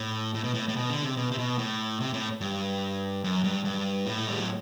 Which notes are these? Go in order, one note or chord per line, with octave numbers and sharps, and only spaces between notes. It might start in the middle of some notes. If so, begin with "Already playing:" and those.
Already playing: A2
A2
B2
A2
A2
B2
D3
C3
B2
C3
B2
A2
C3
A2
G2
F#2
G2
G2
A2
A3
G3
F#3